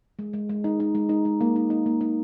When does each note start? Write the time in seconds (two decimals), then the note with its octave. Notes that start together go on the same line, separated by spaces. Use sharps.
0.19 G#3
0.33 G#3
0.49 G#3
0.64 D#4
0.80 D#4
0.95 G#3
1.09 D#4
1.25 G#3
1.41 A#3
1.56 D#4
1.70 D#4
1.86 A#3
2.01 D#4